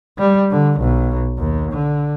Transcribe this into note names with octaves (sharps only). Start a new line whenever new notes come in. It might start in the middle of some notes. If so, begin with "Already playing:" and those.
G3
D3
B1
D#2
D3